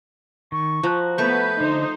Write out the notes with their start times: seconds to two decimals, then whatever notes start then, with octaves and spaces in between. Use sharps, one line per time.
0.52 D#3 C#6
0.83 F3 F#4 A#5 F#6
1.18 A3 B3 B4 C#6 G6
1.60 D3 D#4 C5